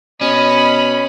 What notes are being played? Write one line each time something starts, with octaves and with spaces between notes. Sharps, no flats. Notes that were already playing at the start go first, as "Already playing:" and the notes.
B2 C#4 D#5 B5